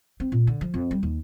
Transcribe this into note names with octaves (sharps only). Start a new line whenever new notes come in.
C4
A#2
D3
F3
F2
G3
D#2